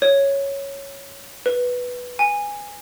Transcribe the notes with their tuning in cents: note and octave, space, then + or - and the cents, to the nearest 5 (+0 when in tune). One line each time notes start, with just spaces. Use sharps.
C#5 -5
B4 -5
G#5 -15